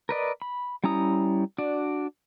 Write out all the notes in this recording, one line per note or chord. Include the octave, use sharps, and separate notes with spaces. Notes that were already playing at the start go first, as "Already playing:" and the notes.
A#4 B4 D5 D#5
B5
G3 C#4 E4 A#5 D#6
D4 F#4 D5